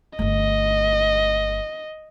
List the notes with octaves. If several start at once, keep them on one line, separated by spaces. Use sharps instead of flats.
G1 A3 D#5